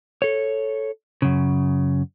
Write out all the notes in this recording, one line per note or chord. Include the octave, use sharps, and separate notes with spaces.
A4 C#5
F#2 C#3